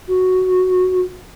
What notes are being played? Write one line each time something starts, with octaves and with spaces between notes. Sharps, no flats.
F#4